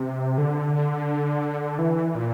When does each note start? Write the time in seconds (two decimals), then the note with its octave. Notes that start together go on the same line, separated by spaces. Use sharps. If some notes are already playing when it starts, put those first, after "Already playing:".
Already playing: C3
0.38 D3
1.79 E3
2.15 A#2